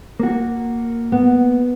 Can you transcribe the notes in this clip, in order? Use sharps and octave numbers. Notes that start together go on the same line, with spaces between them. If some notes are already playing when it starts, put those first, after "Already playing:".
A#3 F#4
B3